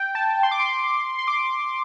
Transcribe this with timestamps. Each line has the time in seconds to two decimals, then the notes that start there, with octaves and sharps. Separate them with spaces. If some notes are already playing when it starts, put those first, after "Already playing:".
Already playing: G5
0.15 A5
0.43 C6
0.51 D6
0.59 C6
1.18 C6
1.27 D6